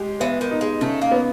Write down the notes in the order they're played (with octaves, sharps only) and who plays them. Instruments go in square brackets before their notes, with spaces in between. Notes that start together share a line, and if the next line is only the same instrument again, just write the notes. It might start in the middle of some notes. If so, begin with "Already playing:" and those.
Already playing: [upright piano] G#3 G4
[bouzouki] E3 [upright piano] B3
[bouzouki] D#3
[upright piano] D#4
[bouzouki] G#3
[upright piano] C#3 [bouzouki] A3
[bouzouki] A#3
[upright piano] B3